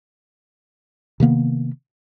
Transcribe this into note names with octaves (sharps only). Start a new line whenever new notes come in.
C3 D#3 A#3 B3